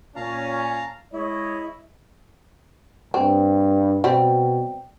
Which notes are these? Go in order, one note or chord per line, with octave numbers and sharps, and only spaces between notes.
A#2 C#4 F5 A5 A#5
G#3 E4 C#5 D#5
G2 C4
B2 G3 C4